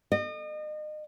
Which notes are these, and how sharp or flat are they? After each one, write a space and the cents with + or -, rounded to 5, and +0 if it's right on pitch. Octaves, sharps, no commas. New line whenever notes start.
D#5 -35